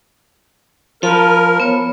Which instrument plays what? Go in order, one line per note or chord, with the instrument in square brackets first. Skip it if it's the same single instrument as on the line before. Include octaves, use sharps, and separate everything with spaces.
[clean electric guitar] F3 [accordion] A#4 [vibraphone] F5 A5 B5
[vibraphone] B3 C#5